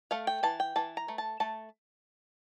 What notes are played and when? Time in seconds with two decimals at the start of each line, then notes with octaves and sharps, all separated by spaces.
0.11 A3 F5
0.27 G5
0.43 E3 A5
0.60 G5
0.76 E3 A5
0.97 A#5
1.08 A3
1.18 A5
1.40 A3 A5